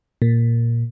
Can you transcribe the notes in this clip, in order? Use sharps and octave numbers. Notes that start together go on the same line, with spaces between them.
A#2